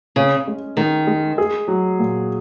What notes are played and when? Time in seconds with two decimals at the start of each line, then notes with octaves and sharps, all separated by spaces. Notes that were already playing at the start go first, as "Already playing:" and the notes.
0.16 C#3 C#4
0.47 G#3
0.77 D#3 G#3
1.07 G#3
1.38 G#4
1.68 F#3
1.99 A#2